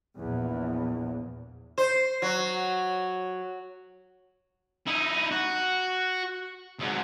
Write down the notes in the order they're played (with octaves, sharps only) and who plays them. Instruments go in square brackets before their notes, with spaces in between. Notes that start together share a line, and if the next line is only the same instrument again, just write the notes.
[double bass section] A#1 E2
[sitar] C5
F#3
[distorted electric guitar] D#4 E4
F#4
G#2 F#3